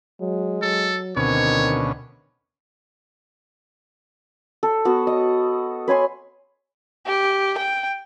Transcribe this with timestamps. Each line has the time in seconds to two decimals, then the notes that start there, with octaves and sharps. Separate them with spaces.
0.20 F#3 G#3
0.62 F#3 A4
1.16 D2 B2 D#3 C4 C#4 C#5
4.63 A4
4.85 B3 F#4
5.07 D#5
5.88 B4 C#5 G#5 C6
7.07 G4
7.58 G5